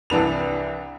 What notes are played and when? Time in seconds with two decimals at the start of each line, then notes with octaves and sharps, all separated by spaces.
0.10 C2 E3 D4 B4 F7